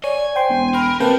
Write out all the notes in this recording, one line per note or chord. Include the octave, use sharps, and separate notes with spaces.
C#5 D5 G#5
C5 G5 C6
E1
A#4 B5
C3 F3 A#3 B4 G5 A5